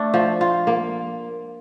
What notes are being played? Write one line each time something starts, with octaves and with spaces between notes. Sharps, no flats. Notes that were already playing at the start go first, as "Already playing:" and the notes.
Already playing: A3 D4
F3
F4
A#3